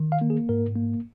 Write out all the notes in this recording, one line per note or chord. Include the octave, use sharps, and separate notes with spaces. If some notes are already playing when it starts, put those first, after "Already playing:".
Already playing: D#3
F5
A#3
G#4
G#2 A#4
A#3